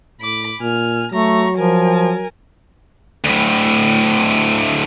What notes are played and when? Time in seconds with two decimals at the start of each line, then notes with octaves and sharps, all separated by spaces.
0.21 A2 B5 D6
0.60 A#2 G#5 F6
1.12 F#3 A3 A#5 C#6
1.58 F3 A#4 G#5
3.25 D2 A2